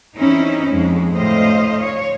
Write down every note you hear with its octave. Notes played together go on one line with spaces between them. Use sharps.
E2 C4 C#4 D#4 E4
F2 G#3
D2 A2 C5 D#5 F5
C#5